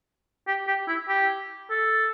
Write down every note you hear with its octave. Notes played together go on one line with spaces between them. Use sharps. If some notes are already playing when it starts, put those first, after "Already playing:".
G4
G4
E4
G4
A4